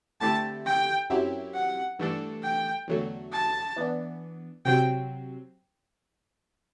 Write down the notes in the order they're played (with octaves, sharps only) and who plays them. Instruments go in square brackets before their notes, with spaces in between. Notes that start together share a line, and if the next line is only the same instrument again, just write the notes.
[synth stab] D3 A3 C4 E4 G4 [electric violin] A5
[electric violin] G5
[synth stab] F#2 F#3 C4 E4 G4
[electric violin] F#5
[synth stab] G2 E3 A3 D4 A4
[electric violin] G5
[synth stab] E2 D3 F#3 A3
[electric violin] A5
[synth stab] E3 B3 D4
[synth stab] C3 F#3 C4 [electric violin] G5